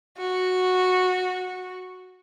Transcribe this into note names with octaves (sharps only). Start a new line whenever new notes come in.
F#4